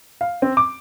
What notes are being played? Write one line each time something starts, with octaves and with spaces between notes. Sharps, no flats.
F5
C4
D6